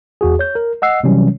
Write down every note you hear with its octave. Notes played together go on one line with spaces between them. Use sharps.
E2 F#4 G#4
C#5 G6
A#4
D#5 F#5 E6 C7
C3 E3 F#3 G3 C#4